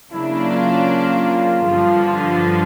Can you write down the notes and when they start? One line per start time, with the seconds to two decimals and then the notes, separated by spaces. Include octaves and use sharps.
0.12 C#3 F#3 A#3 D4 E4
0.50 F4
1.66 G2 D3 F3
2.04 F4